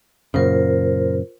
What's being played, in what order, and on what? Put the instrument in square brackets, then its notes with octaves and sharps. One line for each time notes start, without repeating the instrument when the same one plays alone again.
[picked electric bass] F#2 A#2 C#3 [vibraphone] F4 A#4 C5